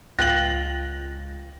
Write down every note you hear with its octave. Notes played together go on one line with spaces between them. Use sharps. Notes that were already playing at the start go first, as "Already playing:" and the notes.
C#2 F4 G5 F#6 A#6 F#7